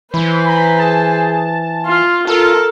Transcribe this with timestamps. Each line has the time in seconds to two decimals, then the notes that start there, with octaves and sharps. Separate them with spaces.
0.14 E3 B4 C5 B5
0.48 A#5 B5
0.79 G#4 A5
1.86 F4 C6
2.27 F4 A4 A#4 A5